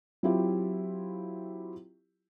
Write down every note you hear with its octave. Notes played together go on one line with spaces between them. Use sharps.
F#3 C4 E4 F4 G4